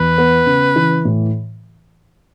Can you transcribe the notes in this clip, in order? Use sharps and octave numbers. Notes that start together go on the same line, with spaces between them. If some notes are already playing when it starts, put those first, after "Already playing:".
Already playing: E2 B4
B3
C#3
E3
A2